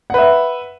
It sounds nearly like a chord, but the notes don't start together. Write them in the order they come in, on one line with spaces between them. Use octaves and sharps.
F#5 B4 E5